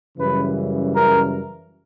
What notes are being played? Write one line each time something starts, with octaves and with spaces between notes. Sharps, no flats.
F#2 C#3 E3 G3 B4
A#4